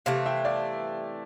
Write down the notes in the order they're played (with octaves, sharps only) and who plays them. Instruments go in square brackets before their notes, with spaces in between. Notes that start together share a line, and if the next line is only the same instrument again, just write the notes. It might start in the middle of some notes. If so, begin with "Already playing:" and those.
[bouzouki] C3 E3 A3 [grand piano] F5 A5
[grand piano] E5 G5
D5 F5